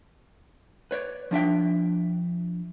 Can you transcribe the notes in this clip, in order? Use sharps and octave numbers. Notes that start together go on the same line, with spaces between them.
B4 C#5 D5
F3 D4 E5 G5